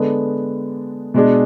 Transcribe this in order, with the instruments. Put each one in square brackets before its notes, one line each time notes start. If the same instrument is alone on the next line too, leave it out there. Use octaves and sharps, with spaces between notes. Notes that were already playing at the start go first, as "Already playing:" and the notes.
Already playing: [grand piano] D3 G#3 B3 D4
B2 G#3 D4 G#4